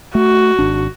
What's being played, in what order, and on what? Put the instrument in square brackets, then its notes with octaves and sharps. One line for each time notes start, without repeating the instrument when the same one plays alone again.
[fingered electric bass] A3 [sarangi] F#4
[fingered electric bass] G#1 D4